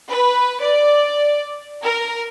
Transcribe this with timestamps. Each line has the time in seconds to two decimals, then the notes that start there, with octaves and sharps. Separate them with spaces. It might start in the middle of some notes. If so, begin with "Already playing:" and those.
0.10 B4
0.62 D5
1.84 A#4